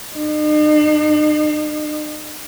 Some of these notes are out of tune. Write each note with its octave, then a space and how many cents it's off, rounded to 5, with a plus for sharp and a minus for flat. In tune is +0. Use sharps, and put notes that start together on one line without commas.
D#4 -45